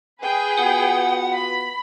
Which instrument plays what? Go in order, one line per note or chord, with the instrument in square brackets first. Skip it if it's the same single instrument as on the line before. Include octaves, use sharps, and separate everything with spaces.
[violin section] G#4 B4 G5
[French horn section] B3 F4 F#4 [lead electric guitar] F#5
[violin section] B5